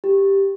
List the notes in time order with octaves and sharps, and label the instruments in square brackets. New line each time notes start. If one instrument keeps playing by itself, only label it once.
[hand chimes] G4